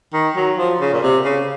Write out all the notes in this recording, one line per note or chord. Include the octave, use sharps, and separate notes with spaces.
D#3
F#3
F3
C#3
A#2
C3
C#3